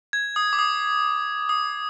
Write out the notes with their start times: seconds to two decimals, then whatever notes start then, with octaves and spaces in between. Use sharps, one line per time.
0.13 G#6
0.36 D#6
0.53 D6
0.59 D#6
1.49 D#6